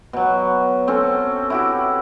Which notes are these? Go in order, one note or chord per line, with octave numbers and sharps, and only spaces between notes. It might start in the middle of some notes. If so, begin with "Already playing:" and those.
B2 F#3
C4 C#4 A4
E4 F#4 G4